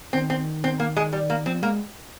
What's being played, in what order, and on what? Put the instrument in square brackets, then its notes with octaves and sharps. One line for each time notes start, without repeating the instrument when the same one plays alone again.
[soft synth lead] D#3 [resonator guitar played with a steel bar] C4
[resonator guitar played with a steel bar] C4
C4
A#3
G#3
G3
A#3
[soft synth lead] F3 [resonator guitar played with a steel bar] C4
[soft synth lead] G#3 [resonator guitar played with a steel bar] A#3